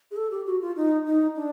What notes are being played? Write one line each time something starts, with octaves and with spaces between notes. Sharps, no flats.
G#4
A4
G4
F#4
F4
D#4
D#4
D4